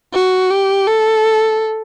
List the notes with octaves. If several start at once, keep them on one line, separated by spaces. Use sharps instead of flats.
F#4
G4
A4